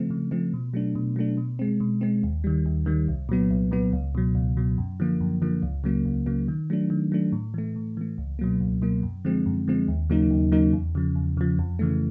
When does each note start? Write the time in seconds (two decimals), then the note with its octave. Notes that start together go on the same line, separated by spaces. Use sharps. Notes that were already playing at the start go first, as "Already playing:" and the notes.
Already playing: C#3 F3 A3 C4
0.10 C#3
0.31 F3 A3 C4
0.53 B2
0.74 F#3 A3 D4
0.95 B2
1.16 F#3 A3 D4
1.37 B2
1.59 G#3 C4
1.80 B2
2.01 G#3 C4
2.23 D#2
2.44 D#3 G3
2.66 D#2
2.86 D#3 G3
3.08 C2
3.29 A#2 F#3 B3
3.51 C2
3.71 A#2 F#3 B3
3.93 C#2
4.15 B2 F#3
4.35 C#2
4.57 B2 F#3
4.78 F#2
5.00 D3 F3 A#3
5.21 F#2
5.42 D3 F3 A#3
5.63 C#2
5.84 C#3 F#3 A#3
6.05 C#2
6.26 C#3 F#3 A#3
6.48 D#3
6.70 F#3 A3 D4
6.90 D#3
7.12 F#3 A3 D4
7.33 A2
7.54 E3 A3
7.76 A2
7.97 E3 A3
8.18 C#2
8.39 B2 F#3 A#3
8.61 C#2
8.82 B2 F#3 A#3
9.03 F#2
9.25 D3 F3 G#3 C4
9.46 F#2
9.68 D3 F3 G#3 C4
9.88 D#2
10.10 C#3 F#3 A#3 D#4
10.31 D#2
10.52 C#3 F#3 A#3 D#4
10.73 E2
10.95 C#3 F3
11.15 E2
11.37 C#3 F3
11.59 F2
11.79 C#3 E3 A3